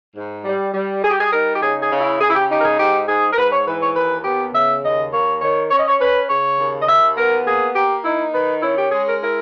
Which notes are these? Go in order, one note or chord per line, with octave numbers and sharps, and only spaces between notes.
G#2
G3
G3
G3 G#4
G4
G#4
D#4 A#4
G4
C#3 G#4
G#4
C#3
E4
C#3 G#4
E4
G4
D#4 G4
A#4
G#4
G#2 G4
G#2 G#4
A#4
G#2 B4
C#5
E3 B4
C#5
D#2 B4
B3 G4
C#3 E5
D#2 D#5
A#3 C#5
D#3 C#5
C#4 C#5
D#5
C#5
C#4 B4
C#3 C#5
D#2
D#5
D#2 E5
B3 A#4
A#3 G#4
A#3 G4
D#4 E4
D#3 B4
C#4 E4
G4
G#3 G#4
A#4
E4 A#4